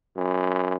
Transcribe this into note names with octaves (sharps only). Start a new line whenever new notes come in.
F#2